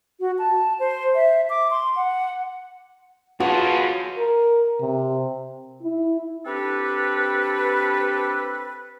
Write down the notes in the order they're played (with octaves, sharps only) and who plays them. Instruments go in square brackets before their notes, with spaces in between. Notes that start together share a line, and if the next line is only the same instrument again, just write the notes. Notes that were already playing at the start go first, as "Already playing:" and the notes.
[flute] F#4
A5
C5
E5
D6
C6
F#5
[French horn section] F#2 [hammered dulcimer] F3 [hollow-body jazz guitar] F#4 [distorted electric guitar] G#4 B4
[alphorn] A#4
C3
[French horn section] E4
[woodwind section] C4 D4 G4 A4 B4